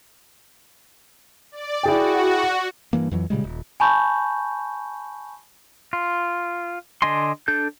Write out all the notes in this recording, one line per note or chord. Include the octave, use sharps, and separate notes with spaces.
D5
E4 F#4 G#4 G5
G2 E3 A#3
F2 E3 F#3
A#2 C#3 G3 G#3
D#1
G#5 A5 B5 C#6 G6
F4
D3 D4 D#5 G#5 C6
D4 A4 G6